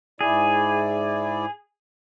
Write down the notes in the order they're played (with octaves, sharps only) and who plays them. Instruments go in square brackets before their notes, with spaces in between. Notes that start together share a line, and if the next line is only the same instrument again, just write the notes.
[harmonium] G#2 E4 D5 [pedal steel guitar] G#4